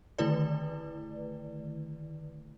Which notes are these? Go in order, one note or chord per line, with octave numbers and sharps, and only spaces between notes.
D3 D#3 A3 E4 B4 D5